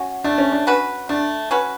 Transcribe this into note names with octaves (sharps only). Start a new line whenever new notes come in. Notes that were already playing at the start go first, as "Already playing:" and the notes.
Already playing: C#4 F#4
A3 D4
C#4
D4
C#4 F#4 B4
A3 D4
C#4 F#4 B4